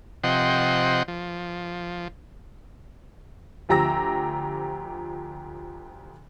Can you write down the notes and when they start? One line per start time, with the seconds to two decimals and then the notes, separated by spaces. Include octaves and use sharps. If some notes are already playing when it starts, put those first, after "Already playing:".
0.24 C3 F3 D#5 F#5 G5 C6
1.08 F3
3.69 D2 F3 G4 A#5 E6 A#6